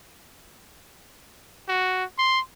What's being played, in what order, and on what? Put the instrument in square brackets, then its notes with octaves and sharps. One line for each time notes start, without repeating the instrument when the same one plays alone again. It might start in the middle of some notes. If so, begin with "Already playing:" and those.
[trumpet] F#4
C6